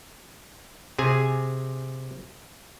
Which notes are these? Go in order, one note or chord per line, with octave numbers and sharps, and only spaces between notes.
C3 G#4 G#5